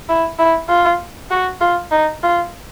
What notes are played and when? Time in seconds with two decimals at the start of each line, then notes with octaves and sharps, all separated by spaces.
0.09 E4
0.39 E4
0.69 F4
1.31 F#4
1.61 F4
1.92 D#4
2.23 F4